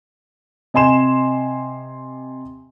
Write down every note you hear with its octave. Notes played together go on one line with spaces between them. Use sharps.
C3 D#5 G#5 C6 E7